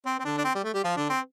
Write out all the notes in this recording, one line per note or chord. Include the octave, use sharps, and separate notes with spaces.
C4
C4
D3 D4
D4
C4
G3
A3
G3 G4
F3 F4
D3 D4
C4